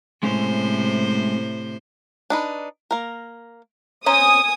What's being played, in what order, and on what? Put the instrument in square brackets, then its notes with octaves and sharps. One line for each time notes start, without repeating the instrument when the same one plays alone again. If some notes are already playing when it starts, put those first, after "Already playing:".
[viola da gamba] A2 C3 C5 [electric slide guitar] G#3 C#4
[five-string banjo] D4 D#4 B4
A#3 A#4
[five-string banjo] C#4 C5 A#5 [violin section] G#5 D#6